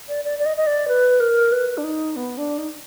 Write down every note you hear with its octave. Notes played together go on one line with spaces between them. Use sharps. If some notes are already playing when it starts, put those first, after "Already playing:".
D5
D5
D5
D#5
D#5
D5
B4
A#4
B4
D4
D#4
B3
D4
D#4